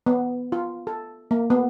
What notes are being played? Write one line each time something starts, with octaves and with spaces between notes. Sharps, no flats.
B3
F4
A4
A#3
B3